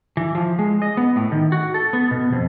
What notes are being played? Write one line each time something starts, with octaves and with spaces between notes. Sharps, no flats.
E3
F3
G#3
D#5
B3
A2
D#3
F#4
A4
B3
B2
F2